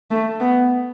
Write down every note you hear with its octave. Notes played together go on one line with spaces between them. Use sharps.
A3
B3